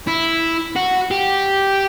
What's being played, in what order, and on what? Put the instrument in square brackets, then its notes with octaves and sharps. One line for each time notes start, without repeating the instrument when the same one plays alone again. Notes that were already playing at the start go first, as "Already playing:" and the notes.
[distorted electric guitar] E4
F#4
G4